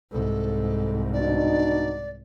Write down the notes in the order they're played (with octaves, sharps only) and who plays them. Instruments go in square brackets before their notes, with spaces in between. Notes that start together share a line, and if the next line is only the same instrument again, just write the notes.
[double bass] C2 G#2 [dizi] A4
[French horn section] B2 D4 D#4 [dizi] D5